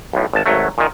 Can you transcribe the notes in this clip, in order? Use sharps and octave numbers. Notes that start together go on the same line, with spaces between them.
B1 A2
G#1 A5
G#1 F#3 A3
A#2 D#3